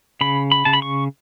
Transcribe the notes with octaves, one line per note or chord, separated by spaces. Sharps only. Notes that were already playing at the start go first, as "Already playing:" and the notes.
C#3 B5
B5
C#3 A5
B5
C#6